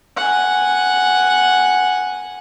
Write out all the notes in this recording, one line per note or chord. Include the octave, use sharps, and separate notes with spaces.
F#5 G#5